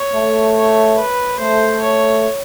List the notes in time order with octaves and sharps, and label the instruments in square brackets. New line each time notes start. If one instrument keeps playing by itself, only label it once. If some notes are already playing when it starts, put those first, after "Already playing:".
Already playing: [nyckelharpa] C#5
[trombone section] A3
[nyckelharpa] C#5
B4
[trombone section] A3 [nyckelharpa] C5
[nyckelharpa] C#5